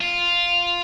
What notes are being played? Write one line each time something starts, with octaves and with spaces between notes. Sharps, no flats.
F4